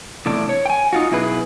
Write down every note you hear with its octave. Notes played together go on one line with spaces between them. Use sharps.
E2 A2 C3 D4
C#5
G5 G#5
D#4 F4 F#4
F#2 B2 E4 G#4 B4